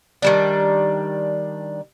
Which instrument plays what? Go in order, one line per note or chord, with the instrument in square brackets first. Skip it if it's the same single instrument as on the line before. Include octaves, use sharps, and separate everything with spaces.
[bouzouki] D#3 G3 D4